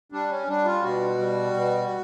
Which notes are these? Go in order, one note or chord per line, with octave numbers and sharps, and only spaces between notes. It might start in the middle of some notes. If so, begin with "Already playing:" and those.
G3 D4
C#4
G3 D4
F4
B2 F#4
G3
B2